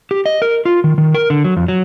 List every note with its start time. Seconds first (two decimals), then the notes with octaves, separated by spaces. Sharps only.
0.11 G4
0.26 D#5
0.42 A#4
0.65 F4
0.84 D#3
0.98 D#3
1.14 A#4
1.30 D3
1.44 F#3
1.57 F2
1.68 F#3